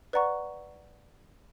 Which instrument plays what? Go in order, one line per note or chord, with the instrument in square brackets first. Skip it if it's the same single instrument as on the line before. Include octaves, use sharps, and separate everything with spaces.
[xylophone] B4 D5 F#5 A#5 C#6